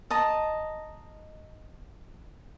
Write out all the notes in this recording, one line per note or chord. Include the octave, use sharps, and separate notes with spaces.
D#5 A5 A#5